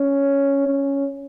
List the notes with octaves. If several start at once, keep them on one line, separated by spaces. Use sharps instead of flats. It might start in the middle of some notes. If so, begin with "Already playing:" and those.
Already playing: C#4
C#4